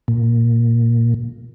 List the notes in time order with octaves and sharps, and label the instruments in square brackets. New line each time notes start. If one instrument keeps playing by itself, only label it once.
[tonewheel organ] A#2